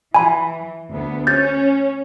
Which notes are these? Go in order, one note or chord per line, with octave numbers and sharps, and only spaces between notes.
E3 G#5 B5
D2 B3
C#4 G6 A6